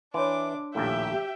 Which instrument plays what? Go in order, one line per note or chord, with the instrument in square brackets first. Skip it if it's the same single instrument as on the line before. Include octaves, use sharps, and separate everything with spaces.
[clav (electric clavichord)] E3 [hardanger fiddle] D4 D6 [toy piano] C#5 A5 C6
[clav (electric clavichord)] A#1 D#2 A2 [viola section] G4 E5 [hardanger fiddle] G5